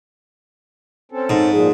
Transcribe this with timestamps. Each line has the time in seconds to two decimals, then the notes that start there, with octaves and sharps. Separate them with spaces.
1.12 C4 C#4 A4
1.30 G#2
1.52 A#2 F3 G#4